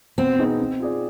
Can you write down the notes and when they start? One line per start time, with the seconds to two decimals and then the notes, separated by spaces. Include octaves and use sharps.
0.18 B2 C4
0.39 B3 D#4 G#4
0.59 C4
0.80 F4 G#4 D5